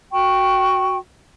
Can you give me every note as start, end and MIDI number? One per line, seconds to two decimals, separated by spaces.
0.13 0.98 66
0.13 0.98 79
0.13 0.98 85